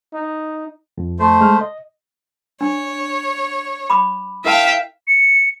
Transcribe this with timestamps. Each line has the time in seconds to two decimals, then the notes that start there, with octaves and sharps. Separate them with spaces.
0.13 D#4
0.98 F2
1.19 A3 C5
1.41 G#3 F6
1.61 D#5
2.61 D4 C#5
3.90 B5 D6
4.45 E4 A#4 E5 F5 G5 A5
5.07 C#7